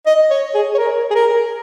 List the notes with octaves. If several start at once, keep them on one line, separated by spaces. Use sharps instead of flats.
D#5
C#5
G#4
C#5
A#4
G#4
A#4